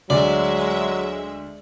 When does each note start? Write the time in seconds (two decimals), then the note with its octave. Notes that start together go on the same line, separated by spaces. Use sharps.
0.10 D2 F#3 G#3 D5 E5